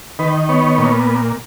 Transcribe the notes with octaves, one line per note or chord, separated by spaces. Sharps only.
D#3 B4
B3 C#5
A#2